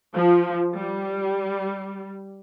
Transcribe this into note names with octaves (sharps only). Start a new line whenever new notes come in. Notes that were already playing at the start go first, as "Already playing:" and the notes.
F3
G3